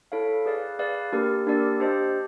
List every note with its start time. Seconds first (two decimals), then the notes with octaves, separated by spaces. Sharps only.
0.12 E4 A4 C#5 F5
0.46 G#4 B4 D5 F5
0.79 G#4 B4 D5 F5
1.12 A#3 D4 G4 A#4 D5
1.47 A#3 D4 G4 A#4 D5
1.80 D4 G4 C5 D#5